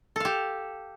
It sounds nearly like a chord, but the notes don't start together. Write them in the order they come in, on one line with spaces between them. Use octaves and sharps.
A4 F5 G4